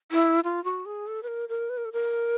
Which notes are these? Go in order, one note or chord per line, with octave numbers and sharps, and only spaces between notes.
E4
F4
F#4
G#4
A4
B4
A#4
A#4
B4
A#4
A4
A#4